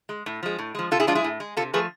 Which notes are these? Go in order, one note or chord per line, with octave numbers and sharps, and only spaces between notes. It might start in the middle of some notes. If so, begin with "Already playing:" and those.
G#3
A2
F3 G#3
A2
F3 G#3
C3 F4 A4
E4 G#4
F3 G#3 D4 F4
E4 G#4
A2
G#3
C3 F4 A4
F3 A3 G#4 B4